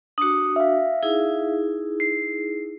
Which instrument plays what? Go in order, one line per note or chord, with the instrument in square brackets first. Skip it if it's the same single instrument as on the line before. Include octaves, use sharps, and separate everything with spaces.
[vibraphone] D4 F#4 [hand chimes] D#6 C#7
[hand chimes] E5 F5
[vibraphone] D#4 E4 G#4
[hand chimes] C7